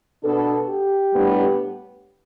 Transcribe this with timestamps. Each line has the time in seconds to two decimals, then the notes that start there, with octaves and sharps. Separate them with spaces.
0.22 B2 B3 D4 A4
0.68 G4
1.12 A2 G3 B3 D4